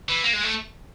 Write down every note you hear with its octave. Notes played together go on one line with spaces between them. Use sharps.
E3
A#3
G#3
A3